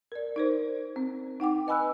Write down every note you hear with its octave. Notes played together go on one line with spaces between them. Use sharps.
A#4 D5
D#4 A#4 C5
C4
D#4 F#5 G5 D6
B4 D#5 G#5 B5 E6 F#6